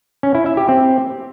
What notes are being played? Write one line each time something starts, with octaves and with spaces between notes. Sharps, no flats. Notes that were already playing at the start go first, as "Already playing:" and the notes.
C#4
E4
E5
G4
C4